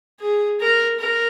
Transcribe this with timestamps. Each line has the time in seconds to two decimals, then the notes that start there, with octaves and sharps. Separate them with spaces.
0.21 G#4
0.60 A#4
0.99 A#4